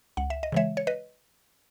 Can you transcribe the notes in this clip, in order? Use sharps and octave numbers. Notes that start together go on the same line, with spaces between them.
C#2 F#5
E5
D#5
C#3 E3 G#3 C#5 E5
C#5
B4 D#5